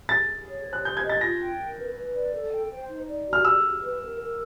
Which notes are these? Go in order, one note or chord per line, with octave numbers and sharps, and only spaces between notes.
G#4 A6
G#4
C#5
C5
F#6
C5 G6
G#6
D#5
A6
F4 A#6
G5
A#4
B4
B4
D5
A4
G5
C5
D#4
D5
F#4
F6
G#4 E6
G#4
B4
A#4
A#4